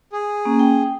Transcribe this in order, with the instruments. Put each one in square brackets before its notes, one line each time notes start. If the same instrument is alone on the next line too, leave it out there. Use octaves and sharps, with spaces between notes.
[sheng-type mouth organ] G#4
[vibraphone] A#3 C#4
G5